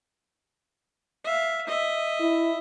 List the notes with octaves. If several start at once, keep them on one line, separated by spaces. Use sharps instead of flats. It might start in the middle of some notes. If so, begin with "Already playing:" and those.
E5 F5
D#5 E5
E4